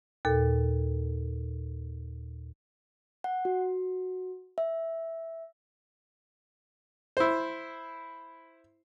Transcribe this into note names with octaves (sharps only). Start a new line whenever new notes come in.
D#2 A#2 A4
F#5
F#4
E5
E4 C5